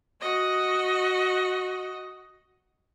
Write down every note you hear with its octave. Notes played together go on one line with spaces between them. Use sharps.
F#4 D#5